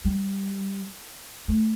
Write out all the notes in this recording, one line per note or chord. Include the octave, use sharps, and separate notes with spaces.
G3
A3